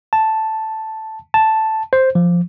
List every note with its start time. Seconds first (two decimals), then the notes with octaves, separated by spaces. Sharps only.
0.13 A5
1.34 A5
1.93 C5
2.15 F3